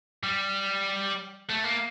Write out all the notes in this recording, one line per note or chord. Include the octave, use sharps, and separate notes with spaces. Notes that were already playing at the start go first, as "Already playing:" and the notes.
G3
A3
A#3